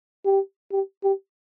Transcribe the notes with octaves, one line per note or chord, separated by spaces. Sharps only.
G4
G4
G4